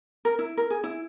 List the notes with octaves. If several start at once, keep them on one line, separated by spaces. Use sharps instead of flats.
A#4
E4
A#4
G#4
E4